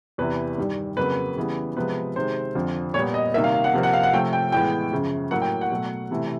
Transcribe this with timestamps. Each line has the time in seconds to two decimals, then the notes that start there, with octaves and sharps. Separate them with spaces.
0.18 E2 C3 E3 B4
0.58 G2 D#3 G3
0.97 F2 C#3 F#3 A#3 B4
1.36 C#3 E3 G3 B3
1.76 C3 F3 G#3 B3 B4
2.16 C3 D#3 G#3 C5
2.55 F2 D3 F3
2.94 A#2 G3 B3 C#5
3.14 D#5
3.34 C3 D#3 G3 A#3 E5
3.44 F5
3.54 F5
3.64 F#5
3.73 C3 F3 A#3
3.83 F#5
3.93 F5
4.03 F#5
4.13 C3 F3 A3 G5
4.33 G5
4.52 A2 E3 G#3 B3 G5
4.92 F#2 C#3 F3
5.31 A2 F#3 A#3 F#5
5.42 G5
5.61 F#5
5.71 B2 F#3 A3
6.11 C3 E3 A3